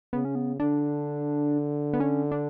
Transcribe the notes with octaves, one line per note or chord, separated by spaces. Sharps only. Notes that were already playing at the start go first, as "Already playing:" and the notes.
C#3 B3
C#4
B3
D3 D4
B3
C#4
D4